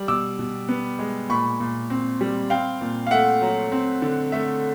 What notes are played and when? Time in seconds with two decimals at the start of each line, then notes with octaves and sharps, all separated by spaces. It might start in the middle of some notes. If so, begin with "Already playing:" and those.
Already playing: G3
0.08 B2 D6 E6
0.39 B2
0.68 B3
0.99 G#3
1.29 A#2 B5 C#6
1.60 A#2
1.90 C4
2.21 G3
2.50 C4 F5 G5
2.81 A#2
3.07 F5
3.11 A3 E5 F#5
3.42 F#3
3.72 C4
4.02 D3
4.32 A3 E5